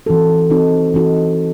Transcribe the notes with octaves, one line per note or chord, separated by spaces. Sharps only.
E3 C4 D#4 F#4 A4
E3 C4 D#4 F#4 A4
E3 C4 D#4 F#4 A4